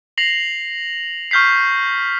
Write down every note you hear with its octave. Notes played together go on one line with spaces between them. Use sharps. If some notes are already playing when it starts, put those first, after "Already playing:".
A#6 C7 F7 F#7
C#6 F6 G6 B6 C7